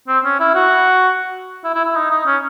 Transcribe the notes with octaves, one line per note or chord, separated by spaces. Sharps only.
C4
C#4
E4
F#4
E4
E4
E4
D#4
D#4
C#4